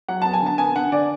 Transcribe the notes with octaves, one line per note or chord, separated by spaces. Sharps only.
F#3 F#5
B3 A5
G#5
D3 A5
B3 G#5
D3 F#5
D3 D5